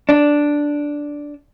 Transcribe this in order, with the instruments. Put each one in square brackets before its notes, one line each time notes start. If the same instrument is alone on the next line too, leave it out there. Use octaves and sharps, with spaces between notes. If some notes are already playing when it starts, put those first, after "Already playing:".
[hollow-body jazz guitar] D4